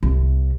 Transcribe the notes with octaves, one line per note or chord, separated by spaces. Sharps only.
C2